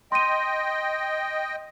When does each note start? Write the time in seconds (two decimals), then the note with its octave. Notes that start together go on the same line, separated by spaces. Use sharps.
0.12 D#5 G5 C6 D#7